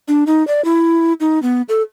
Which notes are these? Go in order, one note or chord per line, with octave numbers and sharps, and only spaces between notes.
D4
D#4
D5
E4
D#4
B3
A4